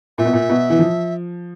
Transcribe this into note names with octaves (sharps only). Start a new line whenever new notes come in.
A#2 E5
B2
A#2
B2
E3
F3